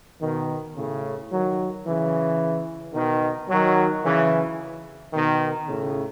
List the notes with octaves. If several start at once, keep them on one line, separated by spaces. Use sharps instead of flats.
B2 D#3
A2 C#3
D#3 F#3
C#3 E3
B2 D#3
D#3 F#3
C#3 E3
B2 D#3
A2 C#3